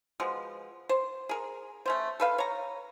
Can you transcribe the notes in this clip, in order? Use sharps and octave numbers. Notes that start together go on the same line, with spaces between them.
B2 F3 G#3
C5
G#4 A#4
A3 C#4 C5
A4 B4 F5
C#5 A#5